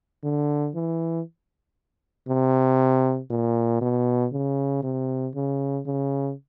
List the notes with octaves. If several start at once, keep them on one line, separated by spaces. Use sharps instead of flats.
D3
E3
C3
A#2
B2
C#3
C3
C#3
C#3